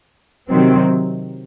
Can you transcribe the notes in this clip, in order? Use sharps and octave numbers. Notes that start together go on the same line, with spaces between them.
C3 D#3 F#3 C4